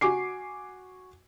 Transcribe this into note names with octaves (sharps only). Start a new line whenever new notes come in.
F#4 G#5 D6 C7